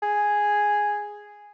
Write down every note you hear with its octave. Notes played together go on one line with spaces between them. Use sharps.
G#4